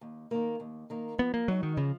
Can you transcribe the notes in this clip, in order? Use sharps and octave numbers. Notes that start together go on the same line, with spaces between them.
D#2
D#3 A#3
D#2
D#3 A#3
F3 B3
A#3
F#3 G#3 D#4 F#4
D#3
C#3 F3